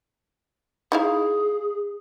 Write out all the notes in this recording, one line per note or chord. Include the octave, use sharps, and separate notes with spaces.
D#4 E4 G#4 F5